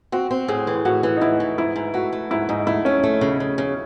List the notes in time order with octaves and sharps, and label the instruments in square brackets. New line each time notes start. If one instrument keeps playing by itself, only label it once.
[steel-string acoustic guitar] C4 [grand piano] F#4
[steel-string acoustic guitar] C4
[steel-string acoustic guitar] A2 [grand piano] G#4
[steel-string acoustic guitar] E3
[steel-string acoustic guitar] A2 [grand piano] F#4
[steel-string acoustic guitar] E3
[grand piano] D#4
[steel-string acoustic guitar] A2 [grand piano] E4
[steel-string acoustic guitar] E3
[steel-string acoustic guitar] G#2 [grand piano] E4
[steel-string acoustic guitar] G#2
[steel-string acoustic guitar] A3 [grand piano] F#4
[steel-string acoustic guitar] A3
[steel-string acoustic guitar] G#2 [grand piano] E4
[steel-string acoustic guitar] G#2 [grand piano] D#4
[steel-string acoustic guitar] A3 [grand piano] E4
[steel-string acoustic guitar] A3 [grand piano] C#4
[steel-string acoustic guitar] A3
C#3
C#3
C#3